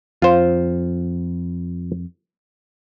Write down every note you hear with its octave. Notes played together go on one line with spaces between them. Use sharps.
F2 F4 C5